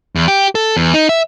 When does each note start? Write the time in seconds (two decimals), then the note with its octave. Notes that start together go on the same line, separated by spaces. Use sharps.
0.15 E2
0.28 G4
0.55 A4
0.77 E2
0.94 D#4
1.09 E5